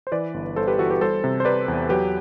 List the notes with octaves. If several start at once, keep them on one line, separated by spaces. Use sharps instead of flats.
C5
E3 B4 D5
G1
G1 A4 C5
G4 B4
E3 F#4 A4
G4 B4
G3 A4 C5
C3
C5
C3 B4 D5
E2
F#3 G4 B4